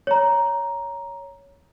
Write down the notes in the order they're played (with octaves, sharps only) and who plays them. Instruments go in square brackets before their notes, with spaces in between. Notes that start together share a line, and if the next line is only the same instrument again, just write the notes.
[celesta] C#5 A#5